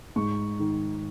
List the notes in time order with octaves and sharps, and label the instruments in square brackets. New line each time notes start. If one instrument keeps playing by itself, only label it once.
[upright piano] G#2 C#6
D#3